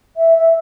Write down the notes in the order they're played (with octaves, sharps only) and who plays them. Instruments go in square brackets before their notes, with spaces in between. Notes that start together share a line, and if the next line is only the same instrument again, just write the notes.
[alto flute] E5
E5